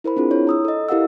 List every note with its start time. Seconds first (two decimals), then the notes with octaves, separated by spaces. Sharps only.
0.04 E4 A#4 C5 B5
0.16 C4 D4 F4 G#4
0.31 E4 C#5
0.47 A#5 D#6 E6
0.65 A4 D#5
0.89 E4 G4 A#4 F5 F#5 E6